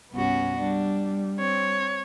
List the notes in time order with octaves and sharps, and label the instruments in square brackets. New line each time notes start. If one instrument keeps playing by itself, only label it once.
[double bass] C2 G2 [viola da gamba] B3 C#4 F#4
[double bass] G3 [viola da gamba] D4
[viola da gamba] C4 [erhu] C#5